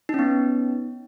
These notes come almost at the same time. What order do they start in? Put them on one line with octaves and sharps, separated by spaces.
D#4 C#4 B3